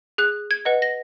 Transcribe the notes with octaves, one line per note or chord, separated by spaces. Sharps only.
G#4 F#6
G#6
B4 D#5 F#5
A#6